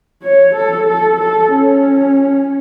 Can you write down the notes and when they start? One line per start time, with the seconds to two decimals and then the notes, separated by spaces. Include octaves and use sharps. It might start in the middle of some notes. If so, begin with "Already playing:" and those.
0.22 C#5
0.55 A4
0.87 A4
1.20 A4
1.52 C#4